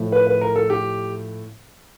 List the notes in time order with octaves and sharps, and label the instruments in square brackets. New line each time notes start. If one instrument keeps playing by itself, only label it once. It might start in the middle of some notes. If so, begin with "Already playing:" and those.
Already playing: [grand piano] A2 F3 A3
B4
B4
A#4
A4
G4